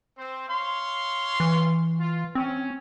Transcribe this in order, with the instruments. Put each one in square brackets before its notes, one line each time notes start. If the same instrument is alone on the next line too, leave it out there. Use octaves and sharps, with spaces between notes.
[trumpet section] C4 C5
C#5 F5 C6
[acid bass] E3
[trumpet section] F4
[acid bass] C4 [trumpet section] C#4